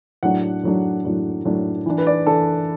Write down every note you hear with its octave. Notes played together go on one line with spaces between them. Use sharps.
A2 F#3 D4 F#5
A2 F#3 D4
A2 F#3 D4
A2 F#3 D4
E3 D4
B4
D5
E3 D4 A4